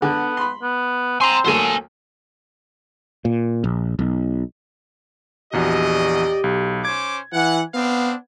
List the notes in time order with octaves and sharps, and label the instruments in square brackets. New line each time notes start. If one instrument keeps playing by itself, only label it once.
[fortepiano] D3 [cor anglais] B3
[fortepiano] B5 C6
[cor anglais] B3
[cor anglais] C4 [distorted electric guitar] G#5 A#5 [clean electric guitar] C6
[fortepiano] D2 F#3 A#3 [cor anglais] A4 [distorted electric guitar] C5 G#5
[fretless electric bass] A#2
A#1
B1
[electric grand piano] A#1 E2 F#4 [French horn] G4 [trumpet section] D5 D#5
[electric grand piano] B1
[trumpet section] C#4 C5 D6 [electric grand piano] G#6
[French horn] E3 [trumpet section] F#5
[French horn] B3 [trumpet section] C4 D4 F5